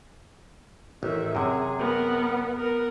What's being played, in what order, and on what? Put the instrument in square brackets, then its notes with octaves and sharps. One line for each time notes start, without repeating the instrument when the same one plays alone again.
[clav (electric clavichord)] A1 [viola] D#3 E5
[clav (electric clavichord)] F#2 C3 [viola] G#4
[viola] B3 A#4
B3 A#4